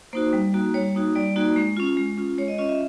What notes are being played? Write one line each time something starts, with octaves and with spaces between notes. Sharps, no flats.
A#3 D#4 F#4 C5
G3
A#3 D#4 F#4
G3 C#5
A#3 D#4 F#4
G3 D5
A#3 D#4 F#4
G#3
C#4 F4
G#3
C#4 F4
G#3 C#5
D#5
C#4 F4 D#5
E5